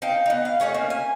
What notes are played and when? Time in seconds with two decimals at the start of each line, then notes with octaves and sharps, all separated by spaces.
0.02 D#4 F5 G5 A5
0.26 B3 D#4
0.45 F5
0.60 A3 C#4 D#4 F#5
0.74 A#3 C#4
0.90 G#5